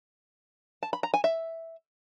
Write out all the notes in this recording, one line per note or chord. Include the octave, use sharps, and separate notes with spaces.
A5
B5
A#5
G#5
E5